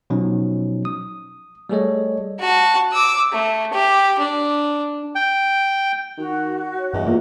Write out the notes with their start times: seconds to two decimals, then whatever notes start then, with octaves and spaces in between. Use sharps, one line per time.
0.10 B2 F3 F#3 C#4 D#4
0.85 D#6
1.69 G3 A3 G#4 A4 C#5 D#5
2.39 F#4 A5
2.92 D6 E6
3.32 A3
3.72 G4
4.19 D4
5.15 G5
6.17 D#3 F#4
6.78 C#5
6.94 E2 G2 D#5
7.07 A#3 F4